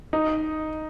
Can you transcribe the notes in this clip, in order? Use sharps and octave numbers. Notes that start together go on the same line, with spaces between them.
D#4